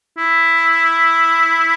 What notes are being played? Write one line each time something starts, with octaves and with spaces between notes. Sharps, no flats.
E4